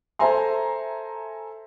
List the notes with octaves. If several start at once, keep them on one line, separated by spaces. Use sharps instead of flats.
A4 C5 E5 G#5 A#5 C6